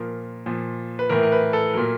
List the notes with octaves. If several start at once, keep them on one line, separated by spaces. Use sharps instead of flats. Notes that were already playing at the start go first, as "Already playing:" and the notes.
Already playing: A#2 F3 A#4
A#2 F3
B4
A2 E3 A#4
A#4
B4
A4
A#2 F#3 A#4